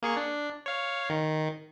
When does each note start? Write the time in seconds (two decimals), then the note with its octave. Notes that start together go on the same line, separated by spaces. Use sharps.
0.03 A#3 G#4 C#6
0.17 D4
0.66 C#5 F5
1.10 D#3